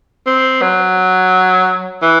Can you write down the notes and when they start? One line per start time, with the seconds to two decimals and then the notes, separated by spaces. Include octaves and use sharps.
0.27 C4
0.62 F#3
2.02 E3